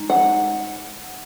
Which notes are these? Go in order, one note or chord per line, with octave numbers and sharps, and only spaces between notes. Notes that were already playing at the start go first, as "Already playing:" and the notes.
Already playing: G#3 D#4
F#5